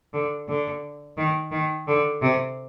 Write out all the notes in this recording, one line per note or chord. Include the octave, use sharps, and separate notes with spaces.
D3
D3
D#3
D#3
D3
C3